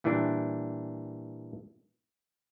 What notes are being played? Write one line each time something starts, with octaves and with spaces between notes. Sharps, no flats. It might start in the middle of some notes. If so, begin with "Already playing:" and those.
A#2 E3 G3 D4